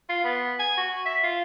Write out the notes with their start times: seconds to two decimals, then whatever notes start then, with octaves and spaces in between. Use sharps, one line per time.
0.09 F4
0.24 B3
0.60 G#5
0.77 F#4
1.06 E5
1.23 F4